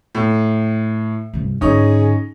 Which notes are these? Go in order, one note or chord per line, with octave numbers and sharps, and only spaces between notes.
A2
C2 G2
G#2 D3 C#4 D#4 G#4